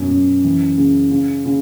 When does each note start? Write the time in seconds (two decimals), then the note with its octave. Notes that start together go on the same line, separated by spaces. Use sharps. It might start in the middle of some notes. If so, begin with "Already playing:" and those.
Already playing: F#2 B2
0.11 F#2
0.44 E3
0.78 C#3
1.11 C#3
1.45 C#3